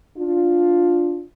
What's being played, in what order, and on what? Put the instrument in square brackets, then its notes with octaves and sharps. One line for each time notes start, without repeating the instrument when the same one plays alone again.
[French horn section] D4 F4